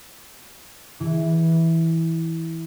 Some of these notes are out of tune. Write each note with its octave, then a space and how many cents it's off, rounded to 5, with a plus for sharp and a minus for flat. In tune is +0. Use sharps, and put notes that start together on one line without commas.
E3 -10